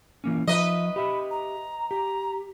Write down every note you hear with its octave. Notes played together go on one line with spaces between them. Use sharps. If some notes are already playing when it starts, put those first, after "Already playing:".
E3 A#3 C#4
F3 B4 D#5 E5
G4 E5 B5
A#5
G4 A#5